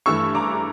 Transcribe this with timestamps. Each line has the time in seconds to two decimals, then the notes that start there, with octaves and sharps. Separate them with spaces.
0.06 G2 E3 A3 C#6 E6
0.35 A#5 D6